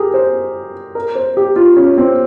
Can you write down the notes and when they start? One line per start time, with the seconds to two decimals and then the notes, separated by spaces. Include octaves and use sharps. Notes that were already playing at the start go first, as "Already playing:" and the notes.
Already playing: G4 G#4 A#4
0.14 C5
0.95 A#4
1.15 C5
1.37 G4
1.56 F4
1.77 C#4
1.98 C4